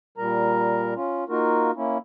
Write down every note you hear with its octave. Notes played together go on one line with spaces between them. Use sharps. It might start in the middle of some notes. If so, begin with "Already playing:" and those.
A#2 G3 A#4 A#5
C#4 F4
A#3 D#4 F4 F#4 A#4
A#3 C#4 E4